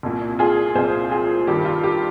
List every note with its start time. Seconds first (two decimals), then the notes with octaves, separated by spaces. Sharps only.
0.03 C2 A#2
0.39 F4 G#4
0.75 C2 A#2 G#4 C5
1.11 F4 G#4
1.47 G2 D#3 G4
1.65 F4
1.84 G4